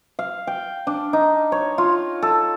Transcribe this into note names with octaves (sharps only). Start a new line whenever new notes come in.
F5
G5
D4
D#4
C#5
F4
A4